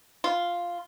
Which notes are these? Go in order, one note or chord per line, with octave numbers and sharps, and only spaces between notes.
F4